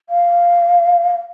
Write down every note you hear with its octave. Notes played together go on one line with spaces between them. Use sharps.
F5